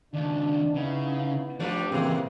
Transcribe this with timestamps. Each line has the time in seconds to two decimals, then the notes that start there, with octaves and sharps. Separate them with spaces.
0.14 C#2 D#3 D4
0.74 C#3 B3 D#4 E4
1.60 F3 G3 A3 D4 B4
1.92 E2 A#2 C#3 E3 A#3 C4 G#4